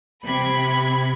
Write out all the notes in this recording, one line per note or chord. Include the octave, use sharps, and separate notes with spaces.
C3 B5 G#6